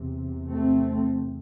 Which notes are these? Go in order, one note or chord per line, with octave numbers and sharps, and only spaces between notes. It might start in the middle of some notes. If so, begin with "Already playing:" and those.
Already playing: E2 C3
A3 C4